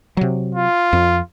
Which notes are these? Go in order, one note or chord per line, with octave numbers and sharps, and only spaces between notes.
C3 F#3
F4
F2